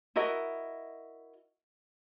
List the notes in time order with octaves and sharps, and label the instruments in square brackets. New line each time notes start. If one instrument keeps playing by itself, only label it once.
[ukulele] E4 F#4 A#4 D#5